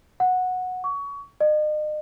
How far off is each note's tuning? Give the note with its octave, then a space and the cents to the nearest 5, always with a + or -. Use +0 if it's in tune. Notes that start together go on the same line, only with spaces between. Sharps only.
F#5 -10
C#6 +25
D#5 -40